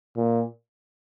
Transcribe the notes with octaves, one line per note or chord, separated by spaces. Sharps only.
A#2